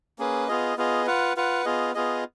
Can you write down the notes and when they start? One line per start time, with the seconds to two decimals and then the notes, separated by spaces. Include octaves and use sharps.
0.19 A#3 C#4 G#4 B4
0.48 B3 F4 G#4 D#5
0.77 B3 F4 G#4 D#5
1.06 F4 B4 F#5
1.37 F4 B4 F#5
1.65 B3 F4 G#4 D#5
1.95 B3 F4 G#4 D#5